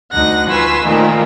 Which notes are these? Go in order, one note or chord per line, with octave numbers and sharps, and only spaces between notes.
D2 D#4 F#5 A#6
F4 B4 G#5 C#6 E6
A#2 D#3 F3 A3 A#3